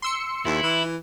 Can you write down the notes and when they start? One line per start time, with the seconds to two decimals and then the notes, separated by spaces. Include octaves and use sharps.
0.02 C6 E6 C#7
0.45 D#2 E4
0.63 E3